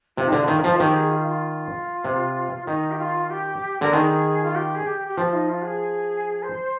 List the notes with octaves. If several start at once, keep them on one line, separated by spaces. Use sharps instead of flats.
C3 F4
D#4
D3 F4
D#3
F3
D#3 G4
G#4
F4
F4
C3
D#3 D#4
G4
F4
G4
D3 A#4
D#3 G#4
F4
G4
G#4
G4
G4
F3 F4
D#4
F4
G#4
C5